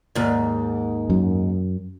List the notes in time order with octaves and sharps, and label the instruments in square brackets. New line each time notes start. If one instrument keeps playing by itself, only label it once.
[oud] D#2 G#2
[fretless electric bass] F#2